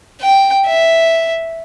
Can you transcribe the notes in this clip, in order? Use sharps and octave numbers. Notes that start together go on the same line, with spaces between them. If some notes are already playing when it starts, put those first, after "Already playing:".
G5
E5